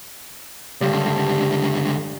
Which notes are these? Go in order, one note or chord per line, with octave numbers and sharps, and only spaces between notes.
C#2 G2 D3